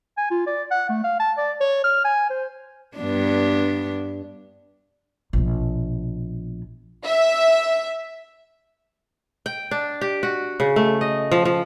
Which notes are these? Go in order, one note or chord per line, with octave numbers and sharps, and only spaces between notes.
G#5
F4
D5
F#5
A3
F5
A5
D5
C#5
F6
G#5
C5
G2 B3 D4
A#1 B2
E5
G5
D4
G4
F#4
C#3
A3
D#5
F3
F3